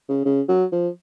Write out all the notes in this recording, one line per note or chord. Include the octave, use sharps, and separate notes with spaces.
C#3
C#3
F#3
F3